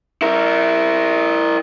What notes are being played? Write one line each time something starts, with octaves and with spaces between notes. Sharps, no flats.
E4 A#4